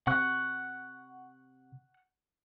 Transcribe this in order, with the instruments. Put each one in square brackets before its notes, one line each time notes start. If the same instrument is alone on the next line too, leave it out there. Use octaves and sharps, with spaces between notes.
[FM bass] C3 [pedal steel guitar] F#5 C#6 F#6